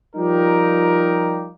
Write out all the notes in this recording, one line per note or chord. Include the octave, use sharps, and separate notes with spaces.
F3 G3 D#4 F4 G4 A#4